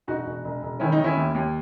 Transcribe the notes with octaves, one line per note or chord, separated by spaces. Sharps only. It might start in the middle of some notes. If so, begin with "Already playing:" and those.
E1 D#4 F#4
E1
E1
E1
D#3 C#4 E4
D#4
D#3
C#4 E4
D#2
D#2